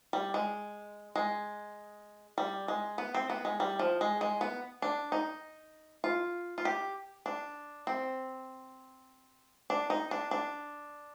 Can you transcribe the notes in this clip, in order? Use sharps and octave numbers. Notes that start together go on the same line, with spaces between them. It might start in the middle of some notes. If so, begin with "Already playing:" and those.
G3
G#3
G#3
G3
G#3
B3
C4
B3
G#3
G3
F3
G#3
G#3
B3
D4
D#4
F4
F4
G4
D4
C4
D4
D#4
D4
D4